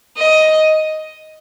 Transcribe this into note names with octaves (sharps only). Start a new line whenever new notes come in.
D#5